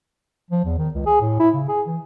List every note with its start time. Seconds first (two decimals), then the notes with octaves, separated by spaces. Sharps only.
0.51 F3
0.65 E2
0.78 D#3
0.94 C#2
1.06 G#4
1.21 A2
1.40 E4
1.54 C#3
1.68 G#4
1.86 E3